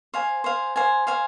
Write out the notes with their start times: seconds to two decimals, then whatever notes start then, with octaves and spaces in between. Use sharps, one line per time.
0.14 C5 F5 G#5
0.44 C5 F5 G#5
0.76 C5 F5 G#5
1.07 C5 F5 G#5